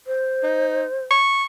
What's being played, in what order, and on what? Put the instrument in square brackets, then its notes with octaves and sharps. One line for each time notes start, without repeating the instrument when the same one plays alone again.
[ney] C5
[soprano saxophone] D#4
C#6